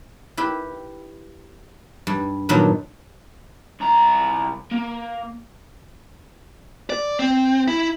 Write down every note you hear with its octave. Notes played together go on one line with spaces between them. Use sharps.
E4 G4 B4
G2
G2 A#2 D#3 F#3 B3 D4
C2 A#5
A#3
D5
C4
E4